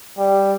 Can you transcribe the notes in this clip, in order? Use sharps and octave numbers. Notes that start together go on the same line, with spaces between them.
G3